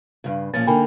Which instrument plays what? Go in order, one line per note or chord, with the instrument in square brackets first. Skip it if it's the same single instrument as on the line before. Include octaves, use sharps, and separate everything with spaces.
[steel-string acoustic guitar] G2 C#3
[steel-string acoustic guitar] A#2 F3 C#4 [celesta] A6
[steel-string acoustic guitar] D3 A#3 D#4 [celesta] G5 G#5 B5